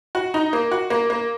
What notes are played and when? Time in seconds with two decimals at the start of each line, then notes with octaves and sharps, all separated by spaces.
0.15 F#4
0.34 D#4
0.53 A#3
0.71 F#4
0.90 A#3
1.10 A#3